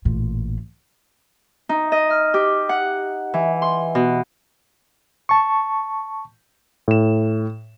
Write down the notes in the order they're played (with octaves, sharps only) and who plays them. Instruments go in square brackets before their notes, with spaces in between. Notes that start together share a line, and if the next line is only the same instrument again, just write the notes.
[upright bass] A1 A#2
[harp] D#4
D#5
F6
G4
F#5
E3
C6
B2
[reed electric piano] A5 C#6
[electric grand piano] A2 E7